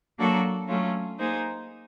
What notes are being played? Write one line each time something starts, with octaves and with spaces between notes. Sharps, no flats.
F#3 A#3 D4 F#4 A4
F#3 A3 C#4 F4
A#3 D#4 G#4 C5